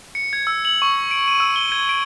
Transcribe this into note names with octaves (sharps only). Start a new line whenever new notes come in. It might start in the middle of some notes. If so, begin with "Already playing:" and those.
C#7
G#6
E6
F#7
C#6
D7
D#7
E6
G7
G#6
D7